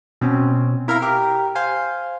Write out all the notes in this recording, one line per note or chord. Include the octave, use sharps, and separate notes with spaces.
B2 C4 C#4
E4 A#4 E5 F5 A#5
G4 A#4
C5 F5 G#5